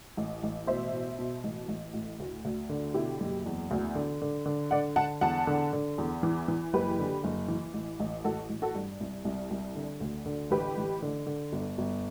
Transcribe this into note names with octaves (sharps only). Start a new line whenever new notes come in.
A1
A1
B2 C5 E5
B2
B2
A1
A1
A2
D2
D2
D3
B2 E4 G4
F#1
E2
D2
D3
D3
D3
D3 D5 F#5
D3 F#5 A5
E2 F#5 A5
D3
D3
E2
E3
E3
F#1 G4 B4
D3
F#1
E3
A1
A1
A1 F#4 A4
A1
F#4 A4
G2
C2
C2
C2
D3
D2
D3
A1 G4 B4
A1
D3
D3
G1
G1